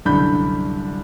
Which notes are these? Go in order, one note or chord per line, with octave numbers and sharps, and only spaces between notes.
C2 F#2 D3 D4 B5 G6